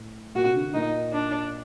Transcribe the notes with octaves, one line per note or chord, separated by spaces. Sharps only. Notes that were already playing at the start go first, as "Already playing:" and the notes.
Already playing: A2
A#2 F#4
C3
D3
D3
A#2 D#4
D4